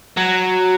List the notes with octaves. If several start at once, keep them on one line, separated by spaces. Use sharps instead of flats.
F#3